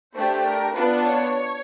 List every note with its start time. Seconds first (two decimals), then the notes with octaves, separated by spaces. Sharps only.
0.15 A3 D4 G4 C5
0.45 A#4
0.75 B3 D4 F4 B4
1.05 C#5